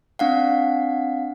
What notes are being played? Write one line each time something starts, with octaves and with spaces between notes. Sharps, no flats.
C4 D4 F5 F#5